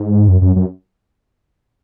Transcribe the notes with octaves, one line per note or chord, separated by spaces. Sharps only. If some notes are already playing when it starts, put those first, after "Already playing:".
Already playing: G#2
F#2
F#2
F#2